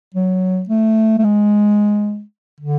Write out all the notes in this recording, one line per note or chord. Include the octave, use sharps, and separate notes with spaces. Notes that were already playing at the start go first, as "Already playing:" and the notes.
F#3
A3
A3
G#3
D3